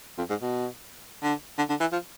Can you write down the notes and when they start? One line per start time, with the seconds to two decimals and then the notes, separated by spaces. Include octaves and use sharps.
0.18 F2
0.30 G#2
0.42 B2
1.23 D3
1.58 D3
1.69 D3
1.80 E3
1.92 F3